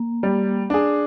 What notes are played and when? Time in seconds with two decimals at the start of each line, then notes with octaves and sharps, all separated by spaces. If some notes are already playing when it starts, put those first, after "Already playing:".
Already playing: A#3
0.23 G3
0.70 D4 G#4